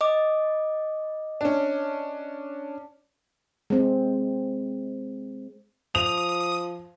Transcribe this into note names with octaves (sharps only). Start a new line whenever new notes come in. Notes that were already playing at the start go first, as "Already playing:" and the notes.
D#5 D6
C#4 D4
G#3 C4
F3 D#6 F7